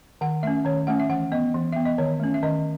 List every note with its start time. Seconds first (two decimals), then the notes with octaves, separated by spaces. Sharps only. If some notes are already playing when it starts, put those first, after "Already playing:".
0.21 D#3 F#5
0.43 A3 C#4 E5
0.65 D#3 C#5
0.87 A3 C#4 F#5
1.00 E5
1.09 E3 F#5
1.32 B3 D#5
1.54 E3
1.72 B3 E5
1.85 D#5
1.98 D#3 C#5
2.20 A3 C#4
2.34 E5
2.43 D#3 D#5